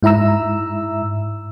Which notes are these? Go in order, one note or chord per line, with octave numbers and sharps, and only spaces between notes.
G#2 E4 E5 A#5 E6